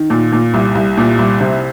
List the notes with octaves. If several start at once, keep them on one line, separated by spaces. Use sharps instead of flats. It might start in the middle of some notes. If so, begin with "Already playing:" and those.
Already playing: D#3
A#2
A#2
C2
C2
A#2
C2
C3